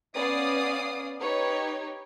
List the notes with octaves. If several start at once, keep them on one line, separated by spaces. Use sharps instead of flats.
B3 C#4 D5 F5 D#6 C7
D#4 G4 B4 C#5